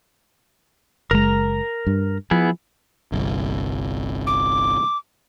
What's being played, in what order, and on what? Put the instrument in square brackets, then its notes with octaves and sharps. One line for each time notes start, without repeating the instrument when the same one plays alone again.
[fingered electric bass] F#1 G#3 [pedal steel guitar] A#4 A#5
[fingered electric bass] G2
[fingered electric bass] F3 [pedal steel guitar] B3 E4 G#4
[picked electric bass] G1 C2
[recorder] D6